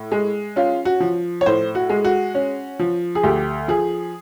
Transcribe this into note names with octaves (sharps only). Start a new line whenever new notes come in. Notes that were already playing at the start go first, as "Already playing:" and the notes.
Already playing: A2
G#3
C#4 F4
F#4
F3
C#5
A2 C5
F#4
G#3
F#4
C#4
F3
G#4
D2 G4
F3 G#4